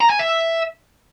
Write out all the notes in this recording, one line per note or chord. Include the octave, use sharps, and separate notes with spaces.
A#5
G#5
E5